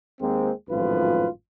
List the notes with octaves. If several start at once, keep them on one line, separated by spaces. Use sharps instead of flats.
D#2 G#3 A#3 C4
G#1 F#2 A2 F3 F4 B4